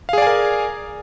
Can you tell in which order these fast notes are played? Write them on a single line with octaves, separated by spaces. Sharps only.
F5 G#4 D5 G#5 A#4